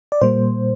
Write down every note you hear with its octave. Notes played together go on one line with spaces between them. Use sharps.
D5
A#2 G3 A#3 C5